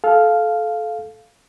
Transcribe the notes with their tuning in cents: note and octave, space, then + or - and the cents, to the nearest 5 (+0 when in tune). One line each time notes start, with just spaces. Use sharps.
A4 -20 F5 +0